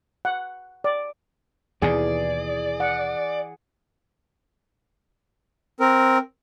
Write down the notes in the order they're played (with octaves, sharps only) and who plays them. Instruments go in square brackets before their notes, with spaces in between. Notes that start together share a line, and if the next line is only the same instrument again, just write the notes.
[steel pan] F#5
D5
[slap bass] D#2 B2 [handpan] E3 [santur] G#4 [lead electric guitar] D5
[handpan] F#5
[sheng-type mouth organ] C4 A#4